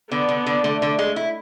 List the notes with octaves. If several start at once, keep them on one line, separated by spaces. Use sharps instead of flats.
D3 B3
D3
D3
D3 A3
D3
G#3
E4